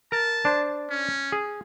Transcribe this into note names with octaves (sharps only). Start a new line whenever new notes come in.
A#4 A5
D4 C5
C#4
G#4